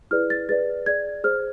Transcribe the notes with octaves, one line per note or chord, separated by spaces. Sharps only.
E4 G#4 B4 D5 F6
A6
G#4 B4 D5 A6
G#4 D5 G#6
G#4 C5 F6